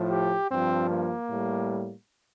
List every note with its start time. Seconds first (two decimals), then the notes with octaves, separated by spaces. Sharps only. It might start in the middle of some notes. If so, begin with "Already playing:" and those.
Already playing: A2 F3
0.11 G4
0.50 G2 F3 C4
0.90 A#3
1.29 A2 G3